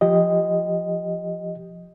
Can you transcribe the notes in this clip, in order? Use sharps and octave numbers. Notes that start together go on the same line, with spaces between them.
F3 G4 D#5